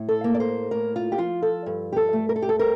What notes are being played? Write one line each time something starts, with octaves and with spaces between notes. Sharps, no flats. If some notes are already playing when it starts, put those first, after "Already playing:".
Already playing: A2
A4
A#3
D5
C5
A2 A#4
F4
G4
F3 F4
A4
G2
G4
A4
A3
A#4
A4
G4
A4
C4 A#4